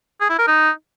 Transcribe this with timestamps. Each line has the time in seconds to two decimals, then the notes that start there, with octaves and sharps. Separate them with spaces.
0.21 G#4
0.30 E4
0.39 A#4
0.48 D#4